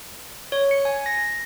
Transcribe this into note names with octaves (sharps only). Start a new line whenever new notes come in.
C#5
C#7
G#5
A#6